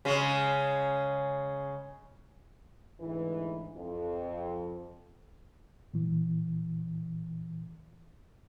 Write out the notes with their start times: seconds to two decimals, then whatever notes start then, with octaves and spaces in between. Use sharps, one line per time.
0.05 C#3 G#3
3.00 D2 G#2 E3
3.76 F2
5.94 A#2 E3